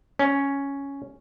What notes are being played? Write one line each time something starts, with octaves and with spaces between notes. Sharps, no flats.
C#4